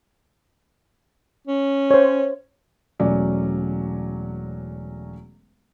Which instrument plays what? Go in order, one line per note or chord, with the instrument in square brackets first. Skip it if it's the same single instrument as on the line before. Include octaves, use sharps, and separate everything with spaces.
[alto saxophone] C#4
[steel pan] C5 C#5
[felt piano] E1 F#3 A3 C#4 D5